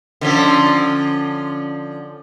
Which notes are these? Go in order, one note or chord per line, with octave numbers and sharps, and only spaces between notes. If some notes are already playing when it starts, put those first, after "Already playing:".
D3 F3 C#4